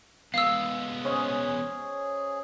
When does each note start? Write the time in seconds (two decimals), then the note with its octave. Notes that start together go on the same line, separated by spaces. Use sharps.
0.34 G#3 B3 F5 E6
1.05 C#4 G#4 C5 D#5